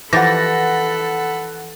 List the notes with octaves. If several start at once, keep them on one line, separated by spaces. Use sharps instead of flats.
E3 F3 G4 A4 F#5 B5 A6 A#6